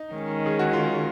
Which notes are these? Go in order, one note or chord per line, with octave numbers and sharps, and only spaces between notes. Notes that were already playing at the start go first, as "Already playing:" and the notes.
Already playing: D#4
D#3 G#3 C#4
G#4
F#4
F4